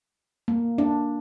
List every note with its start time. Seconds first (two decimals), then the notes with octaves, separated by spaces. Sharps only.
0.48 A#3
0.78 D4